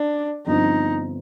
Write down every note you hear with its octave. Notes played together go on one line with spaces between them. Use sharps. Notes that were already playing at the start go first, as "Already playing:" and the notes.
Already playing: D4
G1 G2 F3 C4 D#4